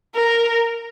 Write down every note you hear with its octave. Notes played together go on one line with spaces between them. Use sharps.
A#4